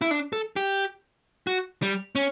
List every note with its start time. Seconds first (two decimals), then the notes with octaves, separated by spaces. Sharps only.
0.02 E4
0.11 D4
0.33 A4
0.56 G4
1.47 F#4
1.82 G3
2.15 C#4